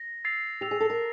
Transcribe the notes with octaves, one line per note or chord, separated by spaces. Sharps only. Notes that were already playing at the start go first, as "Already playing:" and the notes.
Already playing: A#6
E6 A6 C7 F7
G4 E6 A6 C7 F7
G#4
A4
A#4